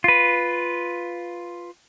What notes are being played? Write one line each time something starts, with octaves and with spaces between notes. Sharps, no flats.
F4 B4